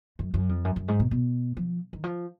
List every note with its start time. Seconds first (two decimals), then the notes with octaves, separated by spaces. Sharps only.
0.19 F#2
0.34 F#2
0.49 F2
0.65 F#2
0.76 F#2
0.88 G#2
1.00 B2
1.11 B2
1.57 F3
1.93 D#3
2.04 F3